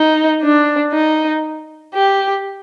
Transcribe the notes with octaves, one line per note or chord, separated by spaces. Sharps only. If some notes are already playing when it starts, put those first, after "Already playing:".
Already playing: D#4
D4
D#4
G4